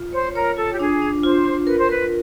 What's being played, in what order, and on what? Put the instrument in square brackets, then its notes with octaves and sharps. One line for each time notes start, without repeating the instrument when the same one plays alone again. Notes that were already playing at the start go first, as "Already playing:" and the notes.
Already playing: [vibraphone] F4
[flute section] C5 [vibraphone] C#5
[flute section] A#4 [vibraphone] C#5
[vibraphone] F4 [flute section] A4
[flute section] G4
[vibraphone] D4 [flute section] G#4
[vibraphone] D4
[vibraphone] F4 [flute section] C5
[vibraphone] F4
[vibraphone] A#4 [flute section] B4
[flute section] C5
[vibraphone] A#4 [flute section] B4